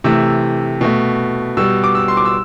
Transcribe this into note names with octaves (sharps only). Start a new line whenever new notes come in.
C3 E3 A3 E6
B2 A3
B2 G3 E6
D6
E6
C6
D6
E6